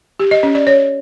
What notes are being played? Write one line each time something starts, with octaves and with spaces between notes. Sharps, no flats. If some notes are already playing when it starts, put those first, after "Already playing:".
G4
D#5
C#4
D5
C#5